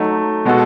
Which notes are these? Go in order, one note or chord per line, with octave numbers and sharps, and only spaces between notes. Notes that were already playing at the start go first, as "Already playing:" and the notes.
Already playing: F#3 A3 D#4
B2 G#3 B3 F#4 A4